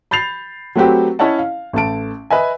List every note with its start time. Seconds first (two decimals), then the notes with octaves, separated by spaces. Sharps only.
0.11 B5 G6 A6 C7 F7
0.75 F#3 A3 C4 F#4 G4 B4
1.19 C#4 E4 C#5 D#5 F#5 A5
1.38 F5
1.73 A1 A3 A5 D7
2.30 B4 D#5 E5 G#5